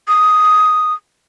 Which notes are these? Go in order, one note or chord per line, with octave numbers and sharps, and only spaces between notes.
D#6